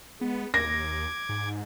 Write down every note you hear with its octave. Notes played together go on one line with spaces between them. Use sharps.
G#3 B3
D#2 D6 G#6 A#6
G#2